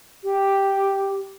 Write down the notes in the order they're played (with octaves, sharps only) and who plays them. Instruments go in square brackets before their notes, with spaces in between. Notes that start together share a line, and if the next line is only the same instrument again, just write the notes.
[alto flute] G4